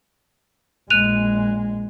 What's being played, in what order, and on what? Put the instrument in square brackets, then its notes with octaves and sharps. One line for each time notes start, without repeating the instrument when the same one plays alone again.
[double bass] A#1 G#3 [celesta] F#6 D#7 F7